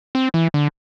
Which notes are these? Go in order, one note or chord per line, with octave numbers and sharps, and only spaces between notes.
C4
E3
D3